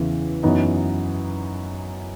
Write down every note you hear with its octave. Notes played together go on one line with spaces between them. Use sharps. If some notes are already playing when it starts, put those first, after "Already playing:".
Already playing: E2 C#3 E3
F#2 E3 B3 D#4